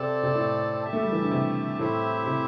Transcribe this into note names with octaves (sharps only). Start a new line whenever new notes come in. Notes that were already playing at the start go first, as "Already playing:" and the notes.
Already playing: C3 C4 A4 D5 A5
C3
A2
G4 E5 A5
A3
G3
E3
D3
C3
A2 C4 E4 G4 E5
C3